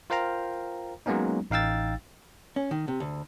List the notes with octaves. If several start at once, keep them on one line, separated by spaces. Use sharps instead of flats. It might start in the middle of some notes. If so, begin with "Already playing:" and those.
F4 A#4 C5 F5 G5 A#5
F#3 G#3 A#3 B3 C#4 D#4
A1 D#4 F5 G5 E6 A6
C#4
D#3
C3
D2